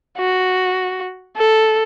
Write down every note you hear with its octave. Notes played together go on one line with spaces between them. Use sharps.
F#4
A4